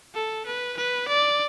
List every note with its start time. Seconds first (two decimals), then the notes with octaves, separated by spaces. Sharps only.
0.15 A4
0.46 B4
0.77 B4
1.08 D5